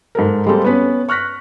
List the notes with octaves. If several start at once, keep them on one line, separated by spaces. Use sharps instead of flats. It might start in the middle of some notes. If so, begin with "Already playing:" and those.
G#2 A4 A#4
G3 G#3 A#3 C4 G4 A4
B3 C#4 B4
C#6 F6 F#6 A#6 B6